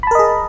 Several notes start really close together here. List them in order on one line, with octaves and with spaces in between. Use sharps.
B5 A5 A#4 D#5 G#4